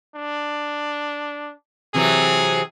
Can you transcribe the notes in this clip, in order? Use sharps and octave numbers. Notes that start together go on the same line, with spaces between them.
D4
C3 E3 F#3 G#4